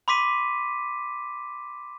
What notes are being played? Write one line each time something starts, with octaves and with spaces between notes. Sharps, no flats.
B5 C6 D6 B6 D#7